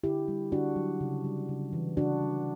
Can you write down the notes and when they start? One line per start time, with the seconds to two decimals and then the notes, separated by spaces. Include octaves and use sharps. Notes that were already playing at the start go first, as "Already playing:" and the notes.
0.03 D3 E4 G4
0.28 G3
0.52 D3 D4 F#4
0.76 F#3
1.01 C#3
1.24 G3
1.49 C#3
1.73 E3
1.97 C#3 D4 F#4
2.21 G3